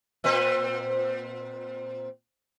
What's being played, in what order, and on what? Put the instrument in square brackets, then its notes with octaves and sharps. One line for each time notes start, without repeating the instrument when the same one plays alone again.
[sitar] A#2 C4 B4